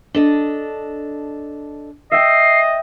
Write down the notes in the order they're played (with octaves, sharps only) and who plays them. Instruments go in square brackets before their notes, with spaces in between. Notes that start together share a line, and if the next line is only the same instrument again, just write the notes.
[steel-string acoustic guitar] D4 A4 D#5
[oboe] D#5 [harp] E5 G5 [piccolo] C7